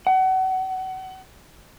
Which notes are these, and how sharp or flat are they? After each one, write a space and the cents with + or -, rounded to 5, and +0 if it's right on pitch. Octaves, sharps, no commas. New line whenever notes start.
F#5 +30